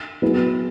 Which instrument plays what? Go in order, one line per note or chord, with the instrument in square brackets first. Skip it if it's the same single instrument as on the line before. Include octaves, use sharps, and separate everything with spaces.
[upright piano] F#3 B3 E4 G#4 B4